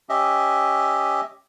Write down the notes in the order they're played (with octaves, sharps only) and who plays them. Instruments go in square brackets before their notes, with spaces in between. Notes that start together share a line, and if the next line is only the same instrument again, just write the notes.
[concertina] C#4 G4 D#5 E5